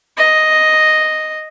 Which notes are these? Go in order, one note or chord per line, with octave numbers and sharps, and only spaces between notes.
D#5